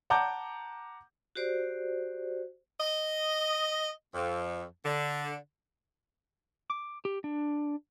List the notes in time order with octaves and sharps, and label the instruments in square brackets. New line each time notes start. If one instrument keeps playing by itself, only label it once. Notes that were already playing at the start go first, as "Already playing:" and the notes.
[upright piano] F#5 A5 A#5 D6 G6
[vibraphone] F#4 G4 C5 D5
[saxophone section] D#5
F2
D3
[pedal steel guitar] D6
G4
D4